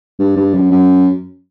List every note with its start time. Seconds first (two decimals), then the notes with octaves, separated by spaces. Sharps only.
0.19 G2
0.37 G2
0.54 F#2
0.71 F#2